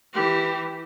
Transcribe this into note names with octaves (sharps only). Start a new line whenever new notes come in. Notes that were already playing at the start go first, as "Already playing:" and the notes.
E3 G4